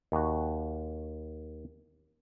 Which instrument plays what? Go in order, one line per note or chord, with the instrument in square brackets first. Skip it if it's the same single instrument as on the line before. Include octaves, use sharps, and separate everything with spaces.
[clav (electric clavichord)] D#2 F#4